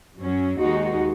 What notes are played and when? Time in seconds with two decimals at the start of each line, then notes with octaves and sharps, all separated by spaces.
0.18 F#2 F#3 C#4
0.59 D#2 D#3 G#3 D#4 F#4